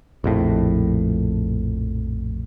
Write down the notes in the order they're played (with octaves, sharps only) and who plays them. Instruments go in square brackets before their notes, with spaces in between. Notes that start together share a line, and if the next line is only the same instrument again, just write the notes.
[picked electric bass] A#1 F2 A2